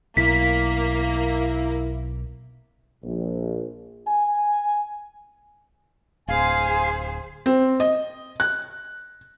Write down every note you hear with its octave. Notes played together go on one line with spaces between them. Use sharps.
B1 A#3 E4 B6
A#1
G#5
D1 G#4 C5 F5 G#5
C4
D#5
F#6